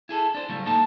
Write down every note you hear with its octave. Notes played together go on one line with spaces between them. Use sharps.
E4 G#4 A4
D4 C5
A2 C#3 F#3 G3 A3
G#2 A#3 D#4 A4 A5